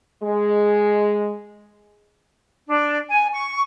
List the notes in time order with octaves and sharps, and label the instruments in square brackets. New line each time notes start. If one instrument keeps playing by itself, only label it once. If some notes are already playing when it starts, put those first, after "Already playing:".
[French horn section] G#3
[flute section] D4
G#5
C#6